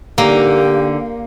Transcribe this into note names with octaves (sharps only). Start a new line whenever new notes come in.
D3 A#3 D#4 G4